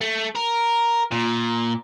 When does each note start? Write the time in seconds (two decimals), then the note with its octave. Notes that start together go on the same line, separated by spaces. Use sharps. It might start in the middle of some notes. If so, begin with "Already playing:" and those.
0.01 A3
0.36 A#4
1.12 A#2